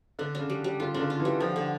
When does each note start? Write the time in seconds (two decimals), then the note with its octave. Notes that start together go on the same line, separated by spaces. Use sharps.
0.19 D3 D4
0.35 C#3 D4
0.50 G3
0.64 G3
0.80 D3 F4
0.94 C#3 D4
1.00 D3
1.10 F4
1.20 E3
1.25 G3
1.40 D3 F3
1.56 D3